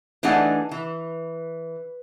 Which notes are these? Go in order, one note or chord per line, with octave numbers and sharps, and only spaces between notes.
E3 A3 D4 D#4 G#4 F#5
E3